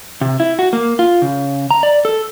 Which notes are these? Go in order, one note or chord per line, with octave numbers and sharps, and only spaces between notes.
C3
E4
F#4
A#3
F4
C#3
A#5
D5
A4